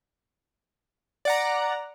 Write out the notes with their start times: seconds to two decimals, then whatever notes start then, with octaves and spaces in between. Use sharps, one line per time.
1.25 D5 F#5 A#5